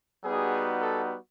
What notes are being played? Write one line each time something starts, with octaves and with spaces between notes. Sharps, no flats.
G3 B3 D#4 F#4 G#4
A4